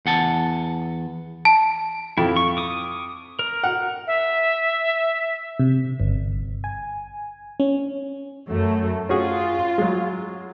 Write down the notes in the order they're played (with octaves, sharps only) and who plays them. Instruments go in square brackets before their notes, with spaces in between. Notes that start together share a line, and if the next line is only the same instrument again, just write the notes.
[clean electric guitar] E2 F#5 A5
[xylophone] A5
[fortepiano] F2 [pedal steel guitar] E4
[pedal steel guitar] C#6
D6 D#6
A#4
[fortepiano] F#5
[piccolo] E5
[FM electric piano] C3
G1
G#5
C#4
[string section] F#2 A3
[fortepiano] C#4 F#4 G#4 [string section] F4
[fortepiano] F#3 G#3